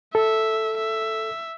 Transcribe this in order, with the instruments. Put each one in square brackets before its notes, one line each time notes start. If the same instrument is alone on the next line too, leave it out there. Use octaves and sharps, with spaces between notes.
[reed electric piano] A4 [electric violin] E5
[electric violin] E5